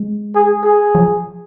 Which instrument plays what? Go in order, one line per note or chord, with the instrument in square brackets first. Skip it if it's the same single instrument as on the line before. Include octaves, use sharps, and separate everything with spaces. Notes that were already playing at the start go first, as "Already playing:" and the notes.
Already playing: [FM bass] G#3
[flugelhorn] G#4
G#4
[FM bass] F3